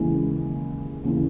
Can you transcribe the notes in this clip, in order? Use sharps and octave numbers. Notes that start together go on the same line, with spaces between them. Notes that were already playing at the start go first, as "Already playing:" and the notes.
Already playing: D#2 C#3 E3 G#3
D#2 C#3 E3